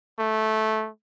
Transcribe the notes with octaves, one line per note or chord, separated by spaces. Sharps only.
A3